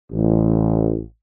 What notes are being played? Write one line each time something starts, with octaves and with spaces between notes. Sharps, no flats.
A1